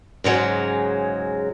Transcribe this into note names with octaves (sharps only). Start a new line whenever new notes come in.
G#2 C#3 F#3 G#3